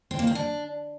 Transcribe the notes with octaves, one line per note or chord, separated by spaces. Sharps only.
C4
A#3
C4
D4